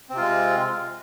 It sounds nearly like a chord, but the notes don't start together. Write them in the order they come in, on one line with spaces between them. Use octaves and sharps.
C4 C3 F4 G#3